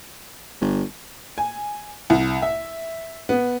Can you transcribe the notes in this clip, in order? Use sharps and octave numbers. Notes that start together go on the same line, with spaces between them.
G1
G#5
C2
E5
B3